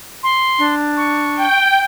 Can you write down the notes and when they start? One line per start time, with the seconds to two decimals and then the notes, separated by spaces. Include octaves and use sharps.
0.23 C6
0.58 D4
0.97 C#6
1.36 G5